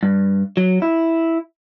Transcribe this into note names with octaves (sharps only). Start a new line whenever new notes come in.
G2
F#3
E4